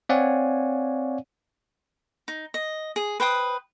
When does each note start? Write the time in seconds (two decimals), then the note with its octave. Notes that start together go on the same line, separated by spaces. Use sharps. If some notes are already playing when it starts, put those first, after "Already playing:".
0.09 C4 C#5 D5 F5 F#5 G#5
2.28 D#4
2.54 D#5
2.96 G#4
3.20 B4 C5 G5 D#6